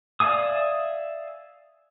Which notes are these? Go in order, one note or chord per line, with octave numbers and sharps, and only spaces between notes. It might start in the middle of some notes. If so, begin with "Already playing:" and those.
D5 E5 F5 G#5 D#6